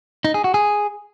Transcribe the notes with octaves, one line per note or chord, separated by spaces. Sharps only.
D#4
G#4
F#4
G#4